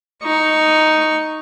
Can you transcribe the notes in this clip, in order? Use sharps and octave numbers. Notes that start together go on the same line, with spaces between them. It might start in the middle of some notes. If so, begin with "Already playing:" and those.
D#4 C#6